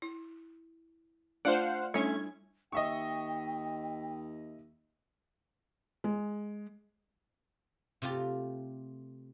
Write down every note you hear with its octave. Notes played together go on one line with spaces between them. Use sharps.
E4
A3 D4 F4 C5 F5 F#5
G3 A3 C#4 D4 E4 G#6
D#2 D#5 E5 G5 C#6
G#3
C3 A3 F4 G4